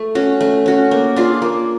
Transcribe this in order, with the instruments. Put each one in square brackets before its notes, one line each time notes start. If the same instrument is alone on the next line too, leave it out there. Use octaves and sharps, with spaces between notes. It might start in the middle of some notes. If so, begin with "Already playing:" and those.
Already playing: [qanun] A3
C#4 F#4
A3
C#4 F#4
A#3
D4 F4 G#4
A#3